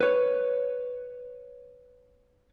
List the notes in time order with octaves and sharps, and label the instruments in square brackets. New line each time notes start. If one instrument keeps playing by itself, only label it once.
[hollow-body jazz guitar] B4 C#5